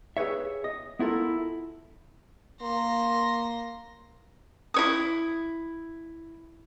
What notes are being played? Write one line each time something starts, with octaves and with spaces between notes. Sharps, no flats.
G4 G#4 B4 C#5 E5
D#5
B3 E4 F4 A4 A#4
A#3 C6 A#6
E4 C#5 D#6